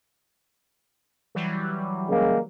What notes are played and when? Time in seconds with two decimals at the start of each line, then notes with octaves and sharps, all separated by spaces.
1.35 E3 F#3 G3
2.09 C#3 G#3 A#3